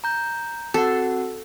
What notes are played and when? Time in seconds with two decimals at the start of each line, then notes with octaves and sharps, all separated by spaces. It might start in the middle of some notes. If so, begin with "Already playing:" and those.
0.04 A#5 G6
0.74 C4 F#4 A4 F#5